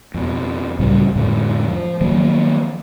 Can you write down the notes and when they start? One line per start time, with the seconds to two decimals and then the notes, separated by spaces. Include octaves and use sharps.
0.14 F2 B2
0.79 C#2 A2 C#3 G3
1.16 F2 A2 D3 G#3
1.68 F3
2.01 D#3 F3 F#3 A#3